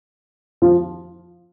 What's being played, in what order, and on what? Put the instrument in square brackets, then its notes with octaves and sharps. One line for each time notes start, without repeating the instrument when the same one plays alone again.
[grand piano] F3